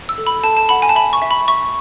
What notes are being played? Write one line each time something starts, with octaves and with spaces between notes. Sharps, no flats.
E6
A4
B5
A4 A5
A5
F#5 B5
G#5
A5
E5 B5
C#6
E5
B5
E5 C#6